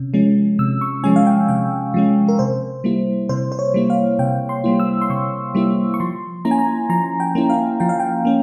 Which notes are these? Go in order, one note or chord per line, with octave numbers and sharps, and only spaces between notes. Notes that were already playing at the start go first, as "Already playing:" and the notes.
Already playing: C3 C#4
F3 G#3 C#4
C3 E6
C#6
F3 G#3 C#4 G#5
F5
G5
C3 G5
F3 G#3 C#4
A#4
C3 C5
G3 A#3 E4
C3 C5
C5
C#5
G3 A#3 E4
F5
C3 G5
C6
G3 A#3 E4
E6
C6
C3 C#6
G3 A#3 E4
C#6
F3 C6
A#3 C#4 E4 A#5
G#5
A#5
F3 A#5
G5
A#3 C#4 E4
F5
F3 G5
F5
G5
A#3 C#4